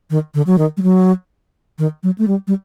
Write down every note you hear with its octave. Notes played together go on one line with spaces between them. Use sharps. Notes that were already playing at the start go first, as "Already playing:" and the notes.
D#3
D3
F#3
D#3
G3
F#3
D#3
F#3
A3
G3
G3